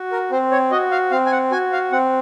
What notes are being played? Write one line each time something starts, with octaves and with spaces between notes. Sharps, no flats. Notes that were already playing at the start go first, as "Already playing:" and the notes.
Already playing: F#4
A#4
C4 C5
C#5
F#4 D#5
F5
C4 F5
G#5
F#5
F#4 G#5
F5
C4 F#5